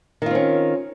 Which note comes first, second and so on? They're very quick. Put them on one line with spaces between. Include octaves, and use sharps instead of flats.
D#3 F4 C4 C#4